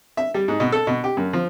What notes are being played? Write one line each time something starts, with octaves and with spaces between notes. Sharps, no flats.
E5
G3
G#2
B2
A4
B2
G4
F#2
F3